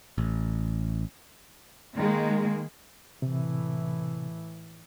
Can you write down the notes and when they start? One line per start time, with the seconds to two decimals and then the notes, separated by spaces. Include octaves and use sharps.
0.18 A1
1.97 D#3 G#3 A#3
3.22 A2 C3 E3